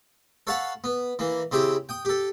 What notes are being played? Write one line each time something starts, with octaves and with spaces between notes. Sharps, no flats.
A4 C#5 F5 F#5 A5 B5
B3
E3 A#3
C#3 C4 E4 G4
G5 D#6
G4 A4